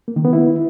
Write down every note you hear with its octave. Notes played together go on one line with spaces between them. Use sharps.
A#3
D#3
B3
E4